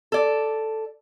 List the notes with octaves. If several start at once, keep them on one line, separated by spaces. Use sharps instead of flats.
A4 D5